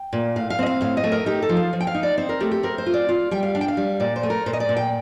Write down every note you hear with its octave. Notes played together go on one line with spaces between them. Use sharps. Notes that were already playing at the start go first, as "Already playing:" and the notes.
Already playing: G5
A#2
A2 F5
F5
C4 D#5
F5
A2 F5
D#5
A3
A#4
D#4 G4
A4
F3
F5
F3
G5
F5
D#4
D5
C4 C5
A#4
A3 G4
G4
C4 A#4
C5
F4
D5
F4
G3 G5
F5
D4 F5
G5
F5
G3
A#2 D5
C5
A3
A#4
A#2 C5
D#5
D5
A#2
G5